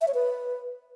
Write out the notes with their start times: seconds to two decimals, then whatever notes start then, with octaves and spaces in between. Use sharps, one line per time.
0.01 E5
0.08 C#5
0.14 B4